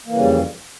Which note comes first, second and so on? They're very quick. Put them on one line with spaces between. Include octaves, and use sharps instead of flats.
A#3 E3 C#3 G3 F2